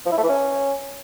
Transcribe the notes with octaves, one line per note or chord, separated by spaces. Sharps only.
F3
E4
A3
E3
C#4